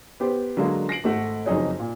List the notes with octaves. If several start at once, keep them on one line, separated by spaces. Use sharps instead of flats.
B3 G4 C5
D3 F#3 G#3 A#3 D4
A#6 C7 D7 F#7
G#1 A3 F#5
F#1 F2 F#3 D#4 G#4 C#5
A#2